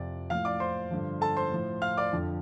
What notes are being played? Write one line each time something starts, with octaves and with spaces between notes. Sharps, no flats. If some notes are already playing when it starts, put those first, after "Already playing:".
Already playing: F2 C3 F3 D5
A2 F3 F5 F6
D5 D6
C5 C6
G2 D3 F3
A4 A5
C5 C6
A2 F3
F5 F6
D5 D6
F2 D3 F3